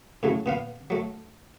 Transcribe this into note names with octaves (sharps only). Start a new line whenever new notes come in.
A2 C#3 F#3 A3
A#2 B3 F5
F#3 A3